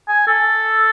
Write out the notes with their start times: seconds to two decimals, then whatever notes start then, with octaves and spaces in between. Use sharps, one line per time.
0.08 G#5
0.27 A4